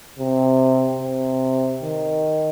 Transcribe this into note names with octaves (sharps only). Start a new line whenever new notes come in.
C3
C3
D#3